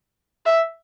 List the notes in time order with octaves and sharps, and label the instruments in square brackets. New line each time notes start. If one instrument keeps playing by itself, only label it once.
[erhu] E5